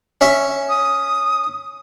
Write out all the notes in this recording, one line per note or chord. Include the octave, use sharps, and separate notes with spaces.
C#4 C#5 E5
D#6